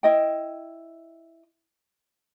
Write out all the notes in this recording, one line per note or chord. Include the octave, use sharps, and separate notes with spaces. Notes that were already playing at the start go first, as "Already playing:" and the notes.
E4 D#5 G5